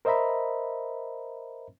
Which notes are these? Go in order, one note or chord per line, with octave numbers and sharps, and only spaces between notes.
A#4 C5 D#5 E5 A#5 B5